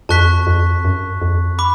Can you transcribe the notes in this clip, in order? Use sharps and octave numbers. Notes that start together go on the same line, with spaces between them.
F2 A5 C#6 F#6 B6
F2
F#2
F2
B5 D6